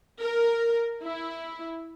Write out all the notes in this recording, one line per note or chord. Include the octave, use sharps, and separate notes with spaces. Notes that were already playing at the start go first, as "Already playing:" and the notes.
A#4
E4